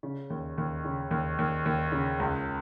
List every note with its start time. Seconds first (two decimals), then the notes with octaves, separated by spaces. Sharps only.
0.03 C#3
0.30 D#2
0.58 D#2
0.85 C#3
1.11 D#2
1.39 D#2
1.66 D#2
1.92 C#3
2.20 C#2